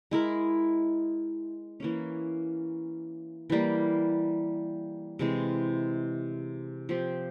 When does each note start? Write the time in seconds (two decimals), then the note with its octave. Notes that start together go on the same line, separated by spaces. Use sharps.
0.11 G#3 E4 A#4
1.80 E3 A#3 C#4
3.50 E3 G3 A#3
5.19 C3 E3 G#3 C4
6.89 F3 C4 G4